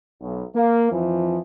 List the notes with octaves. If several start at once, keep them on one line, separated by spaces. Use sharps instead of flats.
B1
A#3
F2 E3 F3